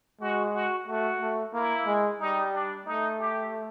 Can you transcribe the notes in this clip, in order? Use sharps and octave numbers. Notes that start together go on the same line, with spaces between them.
G#3 F#4
F#4
A3 F#4
A3
A#3 E4
G#3
G3 D#4
D4
A3 D#4
G4